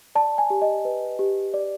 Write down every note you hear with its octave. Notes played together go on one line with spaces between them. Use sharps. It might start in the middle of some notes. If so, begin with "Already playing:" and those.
D5 A5
G#5
G4
D#5
B4
G4
D5